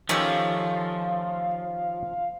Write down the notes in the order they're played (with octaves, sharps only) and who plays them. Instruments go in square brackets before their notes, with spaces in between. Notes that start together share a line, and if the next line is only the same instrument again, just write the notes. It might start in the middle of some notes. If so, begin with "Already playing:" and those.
[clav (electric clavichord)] D#3 C#4 G4 [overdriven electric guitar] F3 [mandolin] A3 E6 [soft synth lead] F5